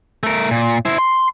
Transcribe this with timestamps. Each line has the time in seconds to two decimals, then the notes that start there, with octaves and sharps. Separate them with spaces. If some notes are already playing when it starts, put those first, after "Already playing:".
0.23 A3 A#4
0.51 A#2
0.85 E4 C5
0.98 C6